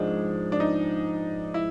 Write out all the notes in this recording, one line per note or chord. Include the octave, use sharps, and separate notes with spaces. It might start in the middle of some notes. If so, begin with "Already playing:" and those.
Already playing: G#2 F3 G#3 D4
D4
D#4
E4